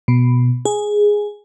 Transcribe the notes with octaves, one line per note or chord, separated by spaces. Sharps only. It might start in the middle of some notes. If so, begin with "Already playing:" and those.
B2
G#4